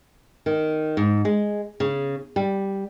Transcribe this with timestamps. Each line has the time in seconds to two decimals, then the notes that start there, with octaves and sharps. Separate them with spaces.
0.46 D#3
0.97 G#2
1.25 G#3
1.80 C#3
2.36 G3